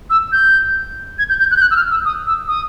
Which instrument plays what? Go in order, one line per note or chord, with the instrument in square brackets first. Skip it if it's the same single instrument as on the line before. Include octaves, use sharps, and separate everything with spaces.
[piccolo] E6
G6
G#6
G6
G6
F#6
G6
F#6
E6
F6
E6
D#6
E6
D#6